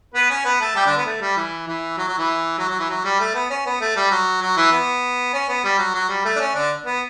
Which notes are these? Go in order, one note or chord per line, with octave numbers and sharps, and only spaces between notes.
B3 B4
C#4 C#5
B3 B4
A3 A4
G3 G4
D3 D4
B3
A3
G3
E3
E3
F#3
F#3
E3
F#3
F#3
E3
F#3
G3
A3
B3
C#4
B3
A3
G3
F#3
F#3
E3
B3
C#4
B3
G3
F#3
F#3
G3
A3
D4
C#4
D3 D4
B3